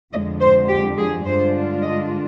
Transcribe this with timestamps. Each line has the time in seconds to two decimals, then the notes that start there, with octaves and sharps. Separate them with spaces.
0.13 F2 D3 G#3 D#5
0.41 C5
0.68 G4
0.97 G#4
1.24 G2 D3 G#3 D4 F4 C5
1.81 D#5